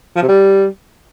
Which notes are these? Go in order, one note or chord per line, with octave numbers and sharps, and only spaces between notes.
F3
C3
G3